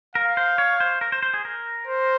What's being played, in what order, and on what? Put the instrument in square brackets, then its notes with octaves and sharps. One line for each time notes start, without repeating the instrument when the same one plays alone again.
[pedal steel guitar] A#4 [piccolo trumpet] F5
[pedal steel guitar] C5
C#5
C5
A#4
C5
C5
G#4
A#4
[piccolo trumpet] C5